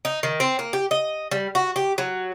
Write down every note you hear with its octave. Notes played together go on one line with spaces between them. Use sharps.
D#4
D#3
C4
A#3
G4
D#5
G3
F#4
G4
F#3